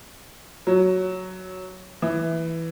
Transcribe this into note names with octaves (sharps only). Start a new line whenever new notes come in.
F#3
E3